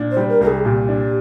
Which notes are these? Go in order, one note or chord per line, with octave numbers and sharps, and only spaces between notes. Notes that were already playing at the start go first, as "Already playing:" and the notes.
Already playing: A#2 D4
C5
G3
A#4
C2 A#4
G#4
A#2 G4
D4